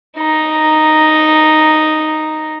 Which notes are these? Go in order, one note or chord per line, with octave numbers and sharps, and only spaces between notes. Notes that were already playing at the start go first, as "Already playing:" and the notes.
D#4 A#5